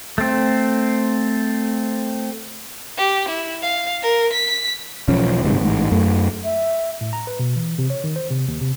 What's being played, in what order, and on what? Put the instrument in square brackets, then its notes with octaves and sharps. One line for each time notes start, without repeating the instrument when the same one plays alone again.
[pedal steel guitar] A3 C4
[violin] G4
E4
F5
A#4
B6
[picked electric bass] E1 B1 F3 C#4
G1 G#2 C3
A1 G#2
F#2 A3
[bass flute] E5
[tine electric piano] A2
A#5
B4
B2
E3
C3
C#5
D#3
C5
C3
D#2
C3